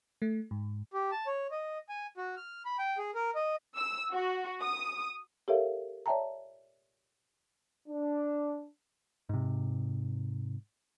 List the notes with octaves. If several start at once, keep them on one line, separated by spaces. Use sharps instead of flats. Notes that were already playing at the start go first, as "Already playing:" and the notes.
A3
G#2
G4
A5
C#5
D#5
G#5
F#4
F6
B5
G5
G#4
A#4
D#5
E6
F#4
D#6
G4 A4 A#4 C#5 E5 F5
C#5 D5 E5 G5 A5 A#5
D4
G#2 C3